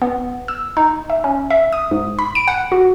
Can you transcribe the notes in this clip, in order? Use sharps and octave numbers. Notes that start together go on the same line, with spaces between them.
B3
E6
D#4
E5
C#4
E5
D#6
G#2
B5
D7
F#5
F#4